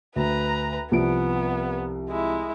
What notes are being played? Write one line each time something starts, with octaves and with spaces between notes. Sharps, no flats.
D2 B4 A#5
C2 F3 B3 D7
G#3 E4